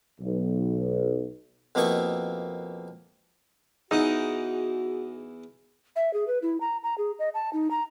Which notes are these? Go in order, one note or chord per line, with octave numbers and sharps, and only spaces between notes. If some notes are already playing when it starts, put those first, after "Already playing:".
B1
F2 B2 A#3 E4 D#5 C#6
E2 E3 D#4 F#4 G#4 F#5
E5
G#4
B4
E4
A#5
A#5
G#4
D#5
A5
D#4
A#5